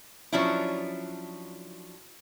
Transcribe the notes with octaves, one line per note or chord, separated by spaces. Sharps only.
F3 F#3 C#4 D4 E4